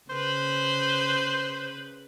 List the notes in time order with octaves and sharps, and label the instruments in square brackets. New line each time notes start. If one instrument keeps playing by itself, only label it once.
[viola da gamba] C#3 B4 [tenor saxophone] C5